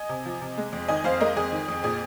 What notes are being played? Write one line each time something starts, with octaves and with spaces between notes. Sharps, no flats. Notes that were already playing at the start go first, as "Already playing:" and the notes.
Already playing: D#5 G#5
C3
F3
C3
G#3
F2
D#3 D#5 G#5
F2 C5 F5
G#3 A#4 D#5
F2 G#4
D#3
F2
A#2 G#4